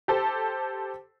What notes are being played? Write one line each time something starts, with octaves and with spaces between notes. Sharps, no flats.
G4 A4 C5